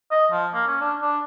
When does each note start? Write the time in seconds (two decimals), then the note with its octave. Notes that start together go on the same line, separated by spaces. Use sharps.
0.11 D#5
0.32 F3
0.53 A#3
0.67 C#4
0.81 D4
1.02 D4